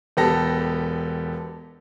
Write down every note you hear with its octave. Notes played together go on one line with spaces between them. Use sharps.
E1 B3 G4 A4 A#6